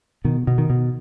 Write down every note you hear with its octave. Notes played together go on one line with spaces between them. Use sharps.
B2 D#3
B2
D#3
B2